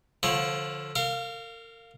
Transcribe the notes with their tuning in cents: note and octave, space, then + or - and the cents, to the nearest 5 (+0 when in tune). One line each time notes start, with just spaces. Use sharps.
D3 +0 F3 +0 C#5 -30
A#4 -35 F5 +0